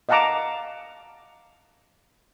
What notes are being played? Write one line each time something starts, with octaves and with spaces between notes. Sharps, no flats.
D#5 F5 F#5 A5 A#5 D6